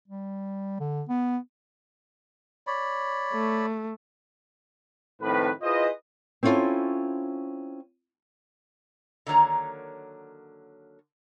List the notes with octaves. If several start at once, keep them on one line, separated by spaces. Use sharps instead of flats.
G3
D3
B3
C#5 D5 B5
A3
F2 A2 D#3 C4 B4
E4 F4 G#4 B4 C5 D#5
C4 C#4 E4 F4 A4
D3 D#3 F#3 A#3 C#5 A#5